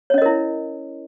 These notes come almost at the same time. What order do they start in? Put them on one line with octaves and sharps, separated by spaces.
C#5 C#4 D#5 A#4 E4